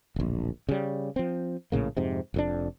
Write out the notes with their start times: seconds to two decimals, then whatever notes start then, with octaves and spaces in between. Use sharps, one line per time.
0.16 D1 A#1
0.69 C#3 G3
1.16 F3 C4
1.72 A#1 A2 C#3 A#3
1.97 F2 G#2 C3
2.34 F1 F2 D4